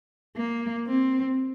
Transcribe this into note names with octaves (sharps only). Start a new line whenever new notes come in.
A#3
C4